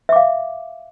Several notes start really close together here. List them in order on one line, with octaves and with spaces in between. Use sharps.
E5 D6 F5